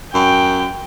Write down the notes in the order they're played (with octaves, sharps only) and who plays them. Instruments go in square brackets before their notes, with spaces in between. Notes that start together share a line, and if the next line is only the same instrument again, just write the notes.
[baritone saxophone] F#2 [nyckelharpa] G5